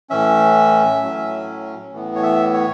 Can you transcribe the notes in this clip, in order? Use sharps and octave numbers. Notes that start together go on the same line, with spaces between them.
A2 E3 C#4 E5
A2 F#3 C#4
A2 E3 B3
C#5
E5
C#5